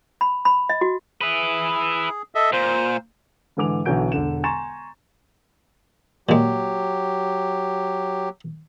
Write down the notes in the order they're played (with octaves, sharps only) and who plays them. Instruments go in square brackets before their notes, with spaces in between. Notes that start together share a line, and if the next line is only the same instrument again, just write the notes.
[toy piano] B5
B5
D#5
F#4
[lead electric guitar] E4 B4 [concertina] G#4
[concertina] A4 D#5 E5
[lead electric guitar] A#2 [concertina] C5
[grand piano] G#2 D3 E3 D6 F7
B1 D3 E3 F#4 G6 D7
E1 D3 E7
G#5 A#5 C6 C#6 A6 E7
[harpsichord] A#2 G#3 [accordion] F#3 G4